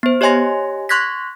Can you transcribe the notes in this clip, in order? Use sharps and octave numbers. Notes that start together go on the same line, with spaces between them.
B3 C5
G4 C#5 D#5 G#5 C6 A#6
C6 C#6 F#6 G#6 A#6 B6